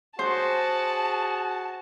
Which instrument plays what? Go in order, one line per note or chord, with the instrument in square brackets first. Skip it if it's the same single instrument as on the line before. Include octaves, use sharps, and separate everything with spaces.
[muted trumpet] F#4 [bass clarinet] G#4 [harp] C5 [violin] A5